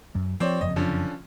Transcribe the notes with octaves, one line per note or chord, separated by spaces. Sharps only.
F#2
F3 C4 C#5 D5
F#1 F2 D#5
D3 F3 C#4